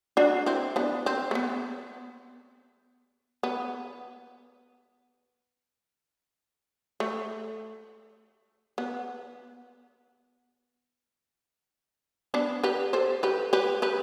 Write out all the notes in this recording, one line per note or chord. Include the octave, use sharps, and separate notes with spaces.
D4 F#4
C4 E4
B3 D4
C4
A3
B3
B3
A3
B3
B3 D4
G4 B4
A4 C5
G4 B4
G4 B4
G4 B4